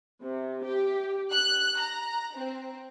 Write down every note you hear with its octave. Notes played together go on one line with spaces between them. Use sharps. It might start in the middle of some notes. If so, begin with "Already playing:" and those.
C3
G4
F#6
A#5
C4